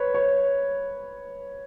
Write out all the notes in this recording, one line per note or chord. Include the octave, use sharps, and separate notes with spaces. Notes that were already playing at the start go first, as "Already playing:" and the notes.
Already playing: B4 C#5
C#5